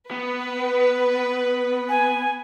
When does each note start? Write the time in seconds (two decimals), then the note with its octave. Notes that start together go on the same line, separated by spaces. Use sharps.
0.11 B3 B4
1.89 G#5